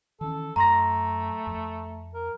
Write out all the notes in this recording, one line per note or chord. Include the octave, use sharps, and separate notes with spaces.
D#3 E3 C#4 A4
F#2 A3 A#5 C6 A#6
F2
A#4